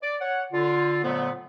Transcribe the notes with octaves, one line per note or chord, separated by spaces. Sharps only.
D5
C#5 F#5
D3 F4
F2 A#2 D3 F#3 A3 B3